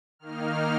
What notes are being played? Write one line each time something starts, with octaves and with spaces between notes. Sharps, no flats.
D#3 A#3 D#4 F6